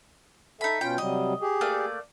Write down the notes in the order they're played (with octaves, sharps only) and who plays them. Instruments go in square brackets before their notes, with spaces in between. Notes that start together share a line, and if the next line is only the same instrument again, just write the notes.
[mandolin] D#4 B5 [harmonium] A4 E5
[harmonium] B2 C#4 F4 [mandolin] G5
[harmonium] C3 F#3 G3 [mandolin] D#5
[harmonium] G4 G#4
[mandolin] A3 A#3 D5